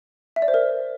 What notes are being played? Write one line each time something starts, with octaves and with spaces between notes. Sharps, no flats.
E5
D5
C5
A#4